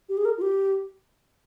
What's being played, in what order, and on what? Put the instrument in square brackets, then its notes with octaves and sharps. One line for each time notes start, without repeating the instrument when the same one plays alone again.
[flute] G4
G#4
A#4
F4
G4